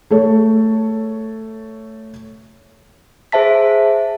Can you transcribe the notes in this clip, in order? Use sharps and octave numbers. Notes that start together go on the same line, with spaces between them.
A3 A4 C#5
G#4 C5 E5 A5 B6